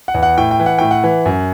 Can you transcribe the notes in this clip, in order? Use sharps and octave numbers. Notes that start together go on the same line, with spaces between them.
F#5
E2
F#5
A2 G5
G5
E3
F#5
A2 G5
F#5
E3
F#2